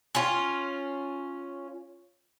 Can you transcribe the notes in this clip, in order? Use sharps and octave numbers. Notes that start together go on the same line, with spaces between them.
C#4 F4